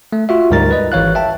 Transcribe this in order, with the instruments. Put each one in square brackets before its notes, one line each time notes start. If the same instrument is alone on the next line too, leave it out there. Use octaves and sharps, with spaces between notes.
[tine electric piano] A3
F4 F#4 E5
D2 G#2 G3 A#4 A#5 A6
B4 D#5
G#1 E3 C#5 F5 F#6
E5 G5 A5